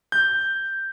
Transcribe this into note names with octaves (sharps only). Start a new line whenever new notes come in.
G6